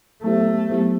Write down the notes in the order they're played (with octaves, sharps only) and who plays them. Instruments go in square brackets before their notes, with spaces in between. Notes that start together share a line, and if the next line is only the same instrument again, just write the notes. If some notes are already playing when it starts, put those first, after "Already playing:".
[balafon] F#3 B3 E4 G4 C5 [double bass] A3
[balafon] F#3 B3 E4 G4 C5